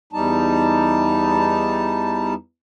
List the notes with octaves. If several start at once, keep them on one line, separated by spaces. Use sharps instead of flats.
E2 G3 D#4 A5